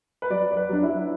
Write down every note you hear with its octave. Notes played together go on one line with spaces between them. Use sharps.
B4
F#3 D5
D5
B4
F#3 D4
E4